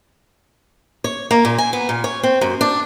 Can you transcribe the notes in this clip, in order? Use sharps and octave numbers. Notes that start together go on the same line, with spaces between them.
C#5
A#3
A#2
G#5
B3
A#2
C#5
C4
F#2
D4